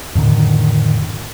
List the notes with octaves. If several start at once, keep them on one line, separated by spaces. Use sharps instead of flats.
F2 A2 D3 D#3